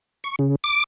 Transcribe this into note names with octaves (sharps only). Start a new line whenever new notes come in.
C#6
C#3
D6